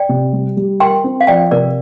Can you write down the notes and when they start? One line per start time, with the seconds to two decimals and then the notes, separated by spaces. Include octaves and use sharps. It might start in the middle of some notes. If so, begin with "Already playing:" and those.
Already playing: D5 G5
0.09 C3
0.33 G3
0.57 G3
0.80 A#4 G5 C6
1.04 C4
1.21 F5
1.27 F3 D5 G5
1.51 C3 A#4 D5